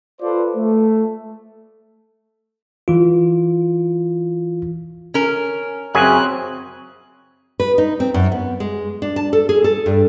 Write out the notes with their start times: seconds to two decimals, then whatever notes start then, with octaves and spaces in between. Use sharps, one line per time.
0.22 F4 A4 B4 C5 D5
0.56 A3
2.88 E3 F4
5.14 C#4 A#4
5.95 F#2 C#3 C4 G#5 F#6
7.60 B4
7.78 D#4
8.00 C4
8.14 F#2
8.32 B3
8.60 G#3
9.02 D4
9.16 A5
9.33 A4
9.49 G#4
9.64 A4
9.86 G2